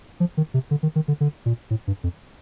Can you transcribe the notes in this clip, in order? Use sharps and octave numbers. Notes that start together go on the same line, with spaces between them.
F3
D#3
C3
D3
D#3
D#3
D3
D3
A#2
A2
G2
F2